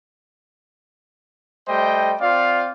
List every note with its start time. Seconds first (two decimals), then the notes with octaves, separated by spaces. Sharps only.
1.68 G3 A3 C5 D#5 G5
2.20 C4 F4 D5 F5